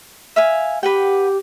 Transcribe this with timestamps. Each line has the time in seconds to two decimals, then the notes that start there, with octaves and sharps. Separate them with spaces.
0.36 E5 F5 G#5
0.83 G4 B4 F#5 G5